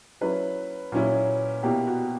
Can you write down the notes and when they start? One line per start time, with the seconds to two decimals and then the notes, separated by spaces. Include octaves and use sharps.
0.21 F#3 C#4 E4 B4
0.92 A#2 F#3 C#4 E4
1.63 B2 A#3 E4 G4
1.87 F#4